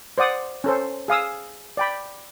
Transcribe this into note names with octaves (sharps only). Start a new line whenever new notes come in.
C5 D5 F#5 D#6
C#4 A4 C5
G#4 F5 D#6 E6
D5 G5 B5